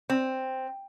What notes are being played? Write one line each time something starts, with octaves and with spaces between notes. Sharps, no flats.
C4